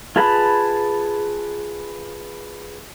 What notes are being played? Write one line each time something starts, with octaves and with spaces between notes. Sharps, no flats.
F4 G#4 B4 A5 B5